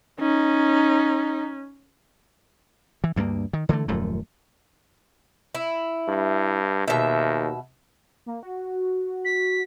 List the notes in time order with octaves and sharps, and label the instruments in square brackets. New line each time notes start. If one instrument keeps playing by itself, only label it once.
[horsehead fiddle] C#4 [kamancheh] D#4
[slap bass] E3
D2 G2 F#3 A#3
D#3
D3 E3 G#3 A3
D#1 F#2 F3 A3
[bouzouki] E4
[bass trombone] G2
[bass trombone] D#2 [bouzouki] B2 E5
[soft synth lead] A#3
F#4
[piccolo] B6